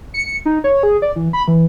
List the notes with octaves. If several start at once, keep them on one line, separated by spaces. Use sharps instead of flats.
C#7
D#4
C#5
G#4
D5
E3
B5
E3